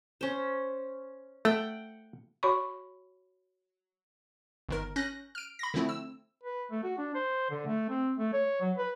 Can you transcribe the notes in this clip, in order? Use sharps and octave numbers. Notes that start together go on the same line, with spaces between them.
C#4 C5
A3 F#5 G5
F#4 C#5 B5 C#6
G1 D#3 A#4
C#4 F#6 G6 A#6
F6 D7
B5 A#6
D3 F3 A3 C4 E4
E6
B4
A3
F#4
D4
C5
D3
A3
C4
A3
C#5
F#3
B4